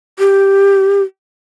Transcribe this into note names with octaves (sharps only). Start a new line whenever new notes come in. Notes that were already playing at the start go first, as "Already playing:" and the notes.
G4